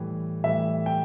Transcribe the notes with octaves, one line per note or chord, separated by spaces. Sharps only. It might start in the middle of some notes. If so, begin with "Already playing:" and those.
Already playing: A2 E3 G3
A2 E3 G3 E5
G5